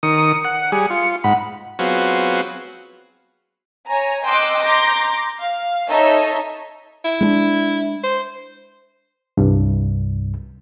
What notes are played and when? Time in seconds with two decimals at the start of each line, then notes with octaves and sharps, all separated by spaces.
0.03 D#3 D#6 C#7
0.45 F#5
0.72 G3 G#4
0.90 F4
1.24 G#2 F#5 B5
1.79 F#3 B3 C4 F4 F#4 G#4
3.88 C#5 G#5 A#5
4.24 D#5 G5 C6 D6 E6 F#6
4.61 A#5 C6 D6 G6 A#6
5.38 F5
5.89 D#4 A4 C#5 D#5 E5
7.05 E4
7.21 G#3 C4 D4
8.04 C5
9.37 C2 G2